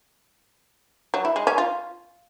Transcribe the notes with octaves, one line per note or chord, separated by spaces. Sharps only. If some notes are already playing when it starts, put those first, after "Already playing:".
F#3
E4
G#3
C#4
F4